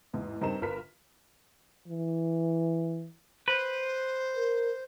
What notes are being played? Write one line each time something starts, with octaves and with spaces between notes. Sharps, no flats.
A1 E2 G#2
G2 C4 D#4 A#4 A#5 E7
G1 F4 A#4 B4 F6 B6
E3
B4 C5
A#4